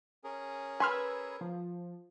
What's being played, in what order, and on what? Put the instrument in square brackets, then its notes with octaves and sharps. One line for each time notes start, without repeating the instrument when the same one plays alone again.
[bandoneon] C#4 G#4 A#4
[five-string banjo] B4 [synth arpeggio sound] G#5 C6 F6 [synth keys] B5 E6 G#6
[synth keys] F3